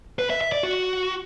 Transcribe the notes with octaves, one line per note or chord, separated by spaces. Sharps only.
B4
E5
E5
D5
F#4